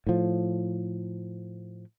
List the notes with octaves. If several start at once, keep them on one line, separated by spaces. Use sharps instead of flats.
A2 F3